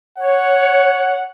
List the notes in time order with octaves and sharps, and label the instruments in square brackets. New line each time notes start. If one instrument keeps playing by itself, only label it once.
[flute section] C#5 [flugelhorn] F#5